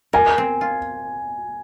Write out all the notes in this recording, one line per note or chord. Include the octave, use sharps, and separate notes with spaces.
A#4 G#5
C4
F4